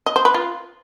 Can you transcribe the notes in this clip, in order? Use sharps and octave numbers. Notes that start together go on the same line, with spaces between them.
D#5
C5
B4
F4